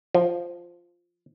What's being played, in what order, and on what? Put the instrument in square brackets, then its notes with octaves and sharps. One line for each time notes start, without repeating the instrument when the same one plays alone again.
[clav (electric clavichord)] F3